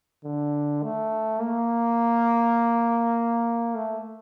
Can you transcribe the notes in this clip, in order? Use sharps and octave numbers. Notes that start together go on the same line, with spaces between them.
D3
A3
A#3
A3